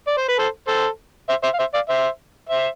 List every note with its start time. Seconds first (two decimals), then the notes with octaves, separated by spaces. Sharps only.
0.07 D5
0.17 C5
0.29 B4
0.38 A4 C5
0.67 A4 C5
1.29 C5 E5
1.43 C5 E5
1.54 F5
1.59 C5 E5
1.74 D5 F5
1.89 C5 E5
2.49 C5 E5